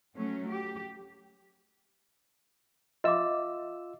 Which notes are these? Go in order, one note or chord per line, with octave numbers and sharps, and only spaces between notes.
F#3 A3 C#4
G4
F4 D#5 E5 D6 E6